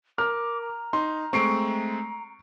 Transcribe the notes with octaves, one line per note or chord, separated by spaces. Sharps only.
A#4 D6 F6
A#5
D#4 C6
G#3 A3 C4 C#6 C7 D7